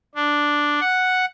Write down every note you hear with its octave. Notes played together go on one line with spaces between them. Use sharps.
D4
F#5